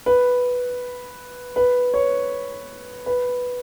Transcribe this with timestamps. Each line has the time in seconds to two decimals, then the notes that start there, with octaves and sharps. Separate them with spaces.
0.06 B4
1.56 B4
1.94 C#5
3.06 B4